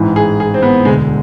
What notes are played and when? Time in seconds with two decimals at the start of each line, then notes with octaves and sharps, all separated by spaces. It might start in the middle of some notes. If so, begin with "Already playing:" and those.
Already playing: A1 G#2 E3
0.16 G#4
0.40 G#4
0.54 C4
0.62 B3
0.85 E1 D2 D3 G#3